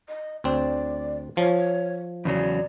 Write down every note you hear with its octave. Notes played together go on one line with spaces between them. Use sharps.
D#5
D2 C4 D5
F3 C#5
E2 C#3 F#3 D5